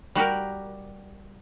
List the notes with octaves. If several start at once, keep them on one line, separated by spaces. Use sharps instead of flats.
G3 F#4 G4 A#4